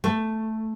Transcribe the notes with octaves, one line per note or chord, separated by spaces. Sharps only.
A3